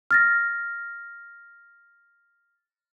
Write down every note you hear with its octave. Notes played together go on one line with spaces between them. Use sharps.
F6 A6 A#6